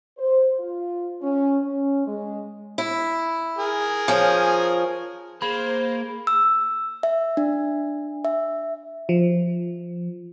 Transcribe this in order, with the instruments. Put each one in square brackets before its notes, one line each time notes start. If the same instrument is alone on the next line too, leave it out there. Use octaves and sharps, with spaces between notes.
[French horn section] C5
F4
C#4
C#4
G#3
[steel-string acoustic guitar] E4
[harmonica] G#4 A#4
[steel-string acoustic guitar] F3 C#4
[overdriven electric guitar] A#3 [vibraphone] G#4 [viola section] C5 [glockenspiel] B5
[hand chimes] E6
E5
D4
E5
[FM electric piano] F3